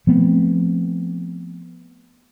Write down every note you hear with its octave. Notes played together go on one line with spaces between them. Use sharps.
F3 A3 B3 C4